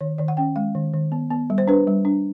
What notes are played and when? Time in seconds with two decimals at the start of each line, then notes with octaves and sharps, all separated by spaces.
0.01 D#3 C#5
0.18 D#3 D5
0.28 F#5
0.37 C#4 G5
0.56 G#3 F5
0.75 D#3
0.94 D#3
1.12 B3
1.31 B3
1.50 G3
1.58 C5
1.68 D4 B4
1.87 G3
2.05 D4